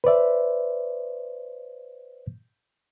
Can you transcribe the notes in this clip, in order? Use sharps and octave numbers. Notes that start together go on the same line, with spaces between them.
B4 C5 D5 E5